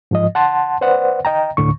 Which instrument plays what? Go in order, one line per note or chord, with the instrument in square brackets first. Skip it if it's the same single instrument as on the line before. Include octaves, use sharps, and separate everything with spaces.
[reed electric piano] G#2 F3 D#5
F#5 A5 C6
B4 C5 D5 F#5
D#5 G5 A#5
D2 A2 D3 C#6